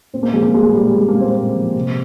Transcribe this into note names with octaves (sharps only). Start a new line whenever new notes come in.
A#2 C4
A#3
F3 G#3
A#3
A#2 G#3
G#3
A#2 G3
G3
A#2 G#3
A#3
A#2
C4
A#2
F3
C3